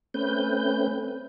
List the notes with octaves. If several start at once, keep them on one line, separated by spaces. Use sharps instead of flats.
A3 C4 C#4 B4 G6